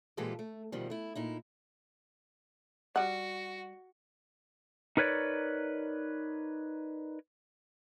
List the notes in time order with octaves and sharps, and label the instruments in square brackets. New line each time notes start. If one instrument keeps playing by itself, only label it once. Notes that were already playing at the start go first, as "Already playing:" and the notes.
[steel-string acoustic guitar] A#2 E3 G#3 F4 G4 A4
A3
D2 B2 D#3 F3 G3
A3 E4
A#2 D#4 E4
[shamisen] G3 F#5 [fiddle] F#4
[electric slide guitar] D#4 A#4 B4 C#5 D5